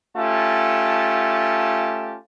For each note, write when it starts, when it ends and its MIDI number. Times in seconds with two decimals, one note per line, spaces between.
0.17 2.17 57
0.17 2.17 61
0.17 2.17 65
0.17 2.17 67
0.17 2.17 81